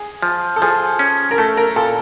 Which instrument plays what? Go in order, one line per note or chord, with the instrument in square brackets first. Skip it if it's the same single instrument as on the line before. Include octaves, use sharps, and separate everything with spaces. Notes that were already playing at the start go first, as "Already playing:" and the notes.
Already playing: [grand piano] G#4
[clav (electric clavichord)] F3
[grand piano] A4
[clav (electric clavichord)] F3 [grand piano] G#4
[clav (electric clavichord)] C#4
[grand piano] A#4
[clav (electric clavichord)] A3 [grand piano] A4
[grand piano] A#4
[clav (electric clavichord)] A#2 [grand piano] A4